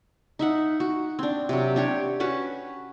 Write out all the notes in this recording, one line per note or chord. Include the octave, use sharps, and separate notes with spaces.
D#4 E5 F#5
F#4
C4 D4
C3 F#3
D4 G4 C#5
C#4 F#4 B4 A5